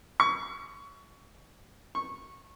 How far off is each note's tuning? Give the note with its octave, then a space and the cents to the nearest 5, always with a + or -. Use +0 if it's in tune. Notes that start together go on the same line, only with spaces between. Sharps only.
C#6 +20
C#6 -15